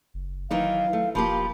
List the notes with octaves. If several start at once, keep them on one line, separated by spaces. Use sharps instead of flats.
F#1
D#3 E3 F#3 D#4 F5
A3
D#1 F3 A#3 G4 B5